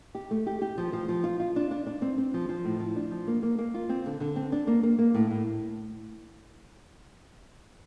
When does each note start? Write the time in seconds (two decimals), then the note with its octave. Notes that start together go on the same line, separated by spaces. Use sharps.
0.15 G4
0.31 A3
0.47 G4
0.62 G4
0.78 F3
0.93 F3
1.08 F3
1.24 F4
1.40 F4
1.56 D4
1.71 D4
1.86 D4
2.02 C4
2.18 C4
2.34 F3
2.49 F3
2.65 A2
2.80 F3
2.96 D4
3.11 F3
3.27 A#3
3.43 A#3
3.59 A#3
3.74 F4
3.89 C4
4.06 D3
4.20 D3
4.36 C4
4.52 D4
4.67 A#3
4.83 A#3
4.98 A#3
5.14 A2
5.31 A2